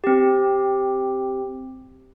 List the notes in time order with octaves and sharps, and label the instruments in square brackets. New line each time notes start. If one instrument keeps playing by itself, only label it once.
[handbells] C4 G4